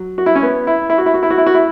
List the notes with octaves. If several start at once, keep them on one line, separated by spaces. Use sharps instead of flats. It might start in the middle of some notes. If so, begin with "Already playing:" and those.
Already playing: F#3
F#4
E4
C#4
B3
E4
E4
F#4
E4
F#4
E4
F#4
E4
F#4
E4